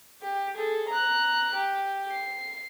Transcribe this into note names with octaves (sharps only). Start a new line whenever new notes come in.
G4
G#4 A4
A#5 F#6
G4
C7